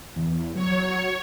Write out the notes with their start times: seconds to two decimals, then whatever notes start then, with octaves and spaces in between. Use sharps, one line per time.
0.16 E2
0.55 F#3 C#5